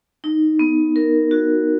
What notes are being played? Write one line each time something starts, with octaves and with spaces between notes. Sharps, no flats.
D#4
B3
A#4
F#4